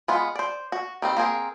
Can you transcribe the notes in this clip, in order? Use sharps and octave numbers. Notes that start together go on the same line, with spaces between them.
G#3 B3 F4
C5 D5
F#4
D#3 G3 C4
A#3 C4 G#4 A#4